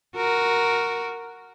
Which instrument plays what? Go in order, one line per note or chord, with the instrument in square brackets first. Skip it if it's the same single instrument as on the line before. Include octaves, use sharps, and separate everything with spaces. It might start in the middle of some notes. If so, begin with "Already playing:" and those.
[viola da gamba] F#4 A#4